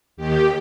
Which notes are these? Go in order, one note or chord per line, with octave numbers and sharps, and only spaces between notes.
D#2 D#3 G4